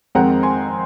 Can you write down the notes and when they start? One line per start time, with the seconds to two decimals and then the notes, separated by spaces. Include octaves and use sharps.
0.15 F2 D#3 G#3 C4 F#5 A#5
0.43 G#5 C6